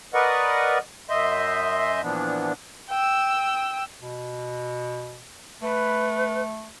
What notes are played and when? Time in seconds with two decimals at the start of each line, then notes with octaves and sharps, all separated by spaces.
0.14 A#4 B4 D5 D#5 F#5 C#6
1.10 F#2 D#5 E5 C6 G6
2.02 A#2 E3 F3 B3 D4
2.89 G5 E6
4.01 B2
5.62 A3 B4